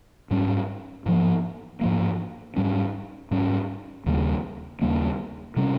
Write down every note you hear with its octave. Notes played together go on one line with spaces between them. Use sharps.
G#2 G3 C#4
G#2 F3 A#3
G#2 F3 A#3
G#2 G3 C#4
G#2 G3 C#4
D#2 C#3 G3 A#3
D#2 C#3 G3 A#3
C3 G3 C#4